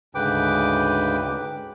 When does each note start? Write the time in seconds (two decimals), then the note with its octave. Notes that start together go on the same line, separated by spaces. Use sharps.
0.15 D2 G#2 C#3 B4 G5 D6